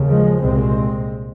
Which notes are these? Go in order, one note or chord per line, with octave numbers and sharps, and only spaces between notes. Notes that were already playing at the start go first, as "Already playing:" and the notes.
Already playing: D#2 C#3
F3 G#3
C2 A#2 G#3 C4